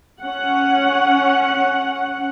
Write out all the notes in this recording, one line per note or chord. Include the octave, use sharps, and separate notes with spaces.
C#4 F#5